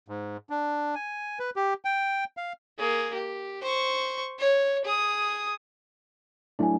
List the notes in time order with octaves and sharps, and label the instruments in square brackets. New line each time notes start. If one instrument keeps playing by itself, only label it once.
[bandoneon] G#2
D4
G#5
B4
G4
G5
F5
[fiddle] A#3 G#4
G4
C5 C#6
C#5
G#4 D#6
[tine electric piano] F#3 A3 D4 [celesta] E4 G#5